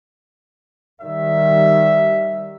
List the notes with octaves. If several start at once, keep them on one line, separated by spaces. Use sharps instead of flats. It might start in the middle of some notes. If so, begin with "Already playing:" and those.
D#3 G3 E5